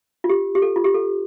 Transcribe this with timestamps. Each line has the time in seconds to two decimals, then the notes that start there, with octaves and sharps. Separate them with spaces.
0.24 F4
0.29 G4
0.55 G4
0.62 A4
0.76 F4
0.84 G4
0.94 A4